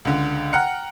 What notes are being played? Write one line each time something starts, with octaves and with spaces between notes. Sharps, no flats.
C#2 D3
F#5 G5 A#5 F6 F#6 C#7